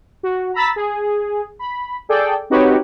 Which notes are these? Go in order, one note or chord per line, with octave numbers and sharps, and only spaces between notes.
F#4
A#5 B5 E6 A6 B6
G#4
B5
G#4 A4 D5 G5
C4 D#4 F#4 G4 B4 C#5